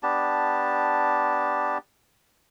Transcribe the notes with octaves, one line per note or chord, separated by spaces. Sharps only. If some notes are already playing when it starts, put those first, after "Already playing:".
B3 D4 G4 A5